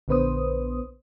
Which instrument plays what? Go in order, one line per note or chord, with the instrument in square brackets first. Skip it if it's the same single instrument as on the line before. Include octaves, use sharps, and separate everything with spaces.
[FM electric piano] A#1 D3 B3 B4 C5 D#6